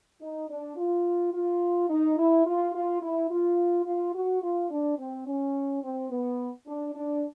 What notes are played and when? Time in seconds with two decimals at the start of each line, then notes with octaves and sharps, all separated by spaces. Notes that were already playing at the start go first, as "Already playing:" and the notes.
0.21 D#4
0.49 D4
0.77 F4
1.33 F4
1.89 D#4
2.17 E4
2.46 F4
2.74 F4
3.02 E4
3.30 F4
3.85 F4
4.14 F#4
4.42 F4
4.70 D4
4.98 C4
5.27 C#4
5.83 C4
6.10 B3
6.67 D4
6.95 D4